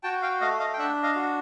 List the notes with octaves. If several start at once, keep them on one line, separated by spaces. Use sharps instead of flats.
F#4 G5 A5
F5 G5
A3 D#5 F5
D#5 F5
G5
D4 E5 F#5
D#5 F5
F#4